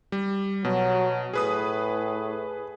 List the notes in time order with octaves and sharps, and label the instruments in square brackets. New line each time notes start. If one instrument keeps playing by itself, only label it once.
[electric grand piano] G3
[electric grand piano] B2 [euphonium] F#3
[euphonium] A2 [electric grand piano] G#4 B4 D#6